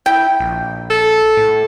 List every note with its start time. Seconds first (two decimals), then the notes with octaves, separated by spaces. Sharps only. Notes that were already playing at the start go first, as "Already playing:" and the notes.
0.06 E4 G5
0.40 A#1
0.90 A4
1.37 A2